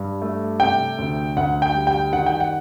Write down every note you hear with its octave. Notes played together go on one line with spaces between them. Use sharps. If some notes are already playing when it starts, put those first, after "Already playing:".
Already playing: G2
A3
C3 G5
D2
D2 F#5
G5
G3
G5
D#3 F#5
G5
F#5